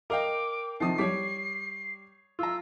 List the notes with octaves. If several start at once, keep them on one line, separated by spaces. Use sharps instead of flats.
A#4 D#5 F5 G5 D6
C3 D#3 F3 A5 D#6 C7
G3 C#5 D6 B6
F4 A#5 E6